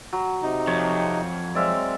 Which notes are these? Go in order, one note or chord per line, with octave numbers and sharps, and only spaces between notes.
F#3
C3 D#4
F2 C#5
F#3 G#3 C4 D5 E5 F5